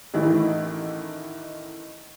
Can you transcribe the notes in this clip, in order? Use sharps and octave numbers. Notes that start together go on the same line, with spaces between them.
A1 D#3 E3 A3 E4